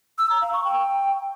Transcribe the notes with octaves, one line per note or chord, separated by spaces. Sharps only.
E6
A#5
F5
C#6
G5